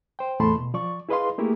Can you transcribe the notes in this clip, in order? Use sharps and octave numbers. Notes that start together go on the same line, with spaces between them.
C5 G5
E2 A2 A3 A5 B5 C6
B2
F3 D5 C#6
E4 G#4 B4 D#5 F5 C6
A3 A#3 E4 G4 G#4 A#4